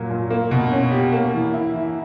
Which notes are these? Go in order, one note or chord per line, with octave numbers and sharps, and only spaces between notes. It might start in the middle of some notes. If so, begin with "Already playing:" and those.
Already playing: A#2 F#3 A#3
A#2
A#3
B2
C#4
G4
A#3
E3
E4
E3